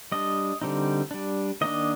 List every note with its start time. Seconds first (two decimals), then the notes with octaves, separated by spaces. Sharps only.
0.12 G3 D4 D#5
0.62 D3 G3 C4 D#4
1.11 G3 D4
1.61 D#3 A#3 D4 D#5